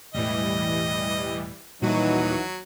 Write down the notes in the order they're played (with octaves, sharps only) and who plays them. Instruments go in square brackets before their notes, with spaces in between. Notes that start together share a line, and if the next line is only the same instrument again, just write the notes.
[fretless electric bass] E1 A2 [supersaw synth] E3 G3 [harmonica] D#5
[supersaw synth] D#2 F#4 D#7 [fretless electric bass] A#2 G3 [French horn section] E3 D#4 [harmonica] F#3